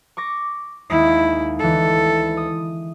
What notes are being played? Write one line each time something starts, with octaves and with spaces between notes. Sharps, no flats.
C#6 D6 A#6
D#2 G#3 E4 D#6
D2 E3 A4
D#6